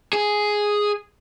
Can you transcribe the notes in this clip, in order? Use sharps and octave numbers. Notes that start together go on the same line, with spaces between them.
G#4